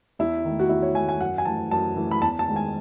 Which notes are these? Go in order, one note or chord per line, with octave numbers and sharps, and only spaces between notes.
E2 E4
D#3 A3
F#4
E2 E4
C#5
D#3 A3 G#5
G#5
F#2 F#5
G#5
E3 A3 A5
F#2 A5
E3 A3
B5
E2 A5
A5
D#3 G#3
G#5